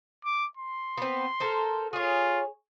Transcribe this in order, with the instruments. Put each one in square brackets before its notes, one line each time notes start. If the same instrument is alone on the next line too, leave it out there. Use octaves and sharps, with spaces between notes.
[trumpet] D6
C6
[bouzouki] B3 C4
A4 A#4 C5
[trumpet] F4 [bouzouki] G#4 C#5